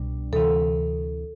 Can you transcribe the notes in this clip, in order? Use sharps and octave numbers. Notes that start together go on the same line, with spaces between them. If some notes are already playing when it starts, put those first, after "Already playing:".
Already playing: C2 B2 G3 D4
D2 C3 E3 A4